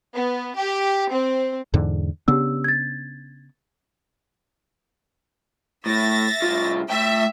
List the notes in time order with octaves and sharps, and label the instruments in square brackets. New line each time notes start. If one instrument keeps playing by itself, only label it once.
[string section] B3
G4
C4
[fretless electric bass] E2 G#2 D3
[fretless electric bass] C#3 B3 D4 [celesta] G4 E6
[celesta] G#6 A6
[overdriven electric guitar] A2 [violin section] E5 A6 A#6
[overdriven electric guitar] C2 F4
[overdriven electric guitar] A3 G5 [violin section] E5